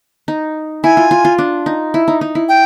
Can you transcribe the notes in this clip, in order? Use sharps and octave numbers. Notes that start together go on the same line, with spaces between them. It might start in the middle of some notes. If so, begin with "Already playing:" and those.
D#4
E4 G#5
F4
F4
F4
D4
D#4
E4
D#4
D#4
E4
G5